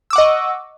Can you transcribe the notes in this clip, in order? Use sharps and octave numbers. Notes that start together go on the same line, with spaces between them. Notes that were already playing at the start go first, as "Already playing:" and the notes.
D#5 F#5 C#6 D6 E6